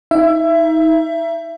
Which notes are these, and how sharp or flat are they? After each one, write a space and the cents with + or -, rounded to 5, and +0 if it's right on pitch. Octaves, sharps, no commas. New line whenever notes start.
D#4 +35 E5 +25